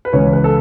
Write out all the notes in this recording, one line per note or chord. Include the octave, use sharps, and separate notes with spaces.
B4
C#2 C#3 E3 C#5
B4
A4